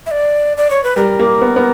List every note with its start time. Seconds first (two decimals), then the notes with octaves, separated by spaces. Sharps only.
0.06 E5
0.11 D5
0.57 D5
0.70 C#5
0.84 B4
0.96 G3 A#4
1.19 A#3
1.41 B3
1.56 B3